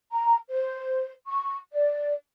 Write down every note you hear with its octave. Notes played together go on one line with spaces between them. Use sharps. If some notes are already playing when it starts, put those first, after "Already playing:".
A#5
C5
C#6
D5